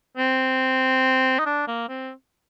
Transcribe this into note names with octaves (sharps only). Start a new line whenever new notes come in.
C4
D#4
D4
A#3
C4